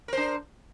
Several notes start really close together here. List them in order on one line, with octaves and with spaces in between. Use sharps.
A#4 C5 D4